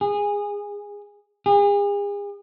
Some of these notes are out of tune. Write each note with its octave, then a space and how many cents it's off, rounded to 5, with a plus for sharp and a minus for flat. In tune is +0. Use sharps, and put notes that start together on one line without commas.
G#4 -20
G#4 -40